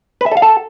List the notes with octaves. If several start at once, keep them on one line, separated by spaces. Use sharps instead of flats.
B4
E5
A4
F5
A4